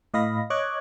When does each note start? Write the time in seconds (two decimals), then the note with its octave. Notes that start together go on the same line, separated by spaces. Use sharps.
0.14 A2 D#5 F5 B5 A#6
0.50 C#5 D#5 D6 F#6 G#6